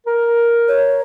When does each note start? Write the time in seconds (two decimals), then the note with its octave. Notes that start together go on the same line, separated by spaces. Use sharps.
0.07 A#4
0.68 C#5